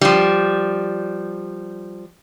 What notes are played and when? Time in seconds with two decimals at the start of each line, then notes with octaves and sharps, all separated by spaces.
0.01 F3 G3